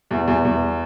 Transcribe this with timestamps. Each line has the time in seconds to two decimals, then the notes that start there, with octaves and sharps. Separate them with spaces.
0.11 E2
0.27 E2
0.45 E2